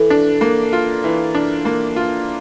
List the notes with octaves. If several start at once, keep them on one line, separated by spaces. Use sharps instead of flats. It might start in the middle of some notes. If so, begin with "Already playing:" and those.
Already playing: E3 A4
D4
A#3
F4
E3
D4
A#3
F4